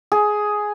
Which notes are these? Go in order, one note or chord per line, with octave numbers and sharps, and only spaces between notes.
G#4